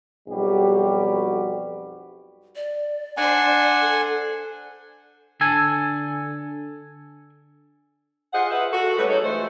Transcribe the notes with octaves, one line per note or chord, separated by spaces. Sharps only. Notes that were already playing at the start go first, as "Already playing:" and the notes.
B1 F2 G3 F#4 G4
D5
D4 C5 F#5 G#5
A4
D3 A4 G#5
F4 G#4 C5 D#5 F#5
F4 G#4 B4 E5 F#5
F#4 A4
G3 A3 C#4 B4
F#3 D#4 F#4 G#4 A4 C#5
E3 G#3 A3 F4 C5